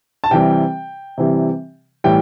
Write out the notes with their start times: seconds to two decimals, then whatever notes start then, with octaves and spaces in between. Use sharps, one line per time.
0.24 A5
0.31 C3 E3 G3 G5
1.18 C3 E3 G3
2.04 A2 E3 G3 G5